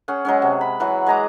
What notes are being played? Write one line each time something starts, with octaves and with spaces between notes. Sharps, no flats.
C#4 G#4 F#5
F#3 G#3 C#4
C3
B5
E3 F#3 F#5
G#3 G#4 A#5 D6